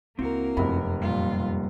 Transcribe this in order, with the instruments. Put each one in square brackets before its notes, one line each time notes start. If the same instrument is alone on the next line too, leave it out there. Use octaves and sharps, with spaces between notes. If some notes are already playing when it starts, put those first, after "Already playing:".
[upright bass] C#2 [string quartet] A#3 A#4 [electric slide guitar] C4 E4 F#4
[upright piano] F1 B5 [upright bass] F#2
[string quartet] A#2 F4 [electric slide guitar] G3 A#3